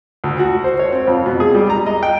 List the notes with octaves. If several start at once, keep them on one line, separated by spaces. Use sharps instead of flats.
D2
F#4
C5
C#5
C4
F2
B2
G#4
G3
A#5
D#5
G5